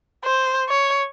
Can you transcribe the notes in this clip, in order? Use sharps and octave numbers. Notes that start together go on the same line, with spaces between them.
C5
C#5